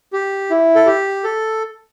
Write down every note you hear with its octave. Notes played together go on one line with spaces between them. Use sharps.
G4
E4
A4
G4
A4